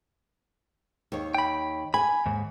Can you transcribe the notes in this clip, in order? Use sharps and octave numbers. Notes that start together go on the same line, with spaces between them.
D#2 C#5
G5 B5
G#5 B5
D#2 G#2